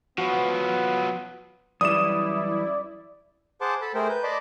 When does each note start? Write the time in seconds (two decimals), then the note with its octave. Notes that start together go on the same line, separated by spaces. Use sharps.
0.18 F3 F#3 B3 F#4
1.81 F#2 E3 G3 E4 D5 D#6 E7
3.61 G#4 C5 F#5 A5 C6 D6
3.81 A4 A5 B5
3.94 A3 G#4 A#4 C5 G5
4.09 B4 G6
4.23 D5 D#5 A5 B5 C6 D6